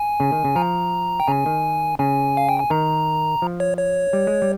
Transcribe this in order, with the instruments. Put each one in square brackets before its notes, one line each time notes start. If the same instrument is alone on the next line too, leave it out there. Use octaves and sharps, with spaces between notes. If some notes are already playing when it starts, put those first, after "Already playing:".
Already playing: [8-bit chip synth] G#5
[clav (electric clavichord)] C#3
D#3
C#3
[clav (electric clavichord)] F3 [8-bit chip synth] A#5
[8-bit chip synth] G5
[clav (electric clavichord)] C#3 [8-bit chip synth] G#5
[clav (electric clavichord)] D#3
[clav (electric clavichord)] C#3 [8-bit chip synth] G#5
[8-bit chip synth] F5
G5
G#5
[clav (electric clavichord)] D#3 [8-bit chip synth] A#5
[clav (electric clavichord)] F3
[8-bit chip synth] C#5
C#5
[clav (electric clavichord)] G3
G#3
G3